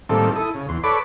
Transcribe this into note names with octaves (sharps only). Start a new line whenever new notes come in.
A2 D#3 G3 A#3 C4 A4
E4 A4 D#6
C#3
E2 C6
A4 B4 C#5 D5 B5 D6